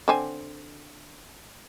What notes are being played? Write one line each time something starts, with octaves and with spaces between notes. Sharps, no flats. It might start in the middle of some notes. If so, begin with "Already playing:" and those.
D3 C4 G#5